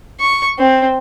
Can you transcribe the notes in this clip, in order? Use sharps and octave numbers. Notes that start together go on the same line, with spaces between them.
C#6
C4